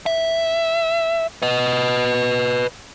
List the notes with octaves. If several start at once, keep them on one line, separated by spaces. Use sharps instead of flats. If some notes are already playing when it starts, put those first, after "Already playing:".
E5
B4 D#5